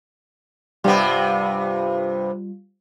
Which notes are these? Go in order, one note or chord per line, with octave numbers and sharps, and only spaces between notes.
G2 C3 G3 B3 F4